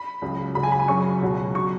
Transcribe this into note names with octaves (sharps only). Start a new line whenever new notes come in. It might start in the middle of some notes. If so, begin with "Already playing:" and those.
Already playing: B5
C#2 C#3 F#3
C#2 C#3 F#3 B5
G#5
B5
G#5
F#2 C#3 F#3 C#6
C#2 B2 F#3
B2 F#3 C#6